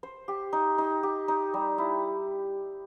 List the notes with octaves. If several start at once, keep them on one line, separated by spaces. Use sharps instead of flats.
C5
G4
D#4
D#4
G4
D#4
G3
E4